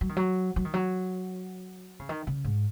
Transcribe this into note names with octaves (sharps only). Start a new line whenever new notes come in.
F#3
D#3
F#3
F#3
D#3
F#3
C#3
D#3
C#3
G#2